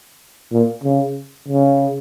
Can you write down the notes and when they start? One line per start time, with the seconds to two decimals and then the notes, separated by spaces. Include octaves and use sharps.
0.52 A#2
0.83 C#3
1.48 C#3